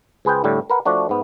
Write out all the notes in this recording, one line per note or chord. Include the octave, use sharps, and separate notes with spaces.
C#2 G#4 B4 C5 G5
A2 D3 G3 A3
A#4 B4 F#5
F3 A3 D4 F#4
G#2 B3